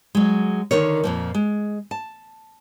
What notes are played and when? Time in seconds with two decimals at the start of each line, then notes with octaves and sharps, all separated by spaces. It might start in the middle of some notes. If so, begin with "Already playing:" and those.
0.15 F#3 G#3
0.71 D3 D#3 A#4 C#5
1.04 F2 A#2 F3
1.35 G#3
1.91 A5